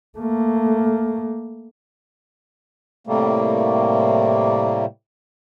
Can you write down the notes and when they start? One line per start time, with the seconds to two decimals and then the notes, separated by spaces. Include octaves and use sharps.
0.19 A3 A#3
3.07 A2 C3 G3 A3 A#3